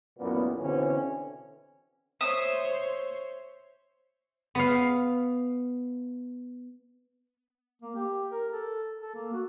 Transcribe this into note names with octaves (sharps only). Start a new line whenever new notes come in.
A1 F#2 A#2 B3
B2 D3 E3 C4 C#4
C5 C#5 E5 D#6
B3 F5
A#3
G4
A#4
A4
A4
A#3
F#4